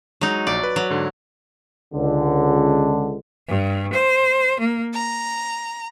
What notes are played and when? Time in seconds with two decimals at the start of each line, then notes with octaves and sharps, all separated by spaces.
0.21 F#3 G#3 D#4
0.47 A#1 D5
0.63 B4
0.76 F#3
0.90 G#2 D3
1.93 C#2 D3
3.48 G2
3.93 C5
4.59 A#3
4.93 A#5